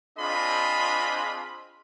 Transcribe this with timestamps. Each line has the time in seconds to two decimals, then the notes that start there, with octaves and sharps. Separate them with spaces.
0.18 C4 D4 F4 G#4 D#5 B5